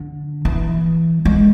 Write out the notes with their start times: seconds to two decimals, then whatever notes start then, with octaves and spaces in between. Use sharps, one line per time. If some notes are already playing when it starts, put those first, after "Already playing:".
Already playing: D3
0.45 E3
1.25 G#3